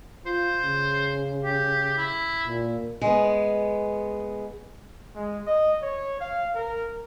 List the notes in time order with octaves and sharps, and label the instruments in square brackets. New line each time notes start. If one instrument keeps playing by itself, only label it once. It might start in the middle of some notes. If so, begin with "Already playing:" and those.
[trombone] F4 [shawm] C5
[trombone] C#3
[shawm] G4
E4
[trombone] A#2
[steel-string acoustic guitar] G#3 B3
[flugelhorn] G#3
D#5
C#5
F5
A#4